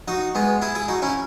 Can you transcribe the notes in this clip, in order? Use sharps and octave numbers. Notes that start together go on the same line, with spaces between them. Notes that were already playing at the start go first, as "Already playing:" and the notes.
D#4 F#4
G#3 B3
E4 G#4
E4 G#4
D#4 F#4
C#4 E4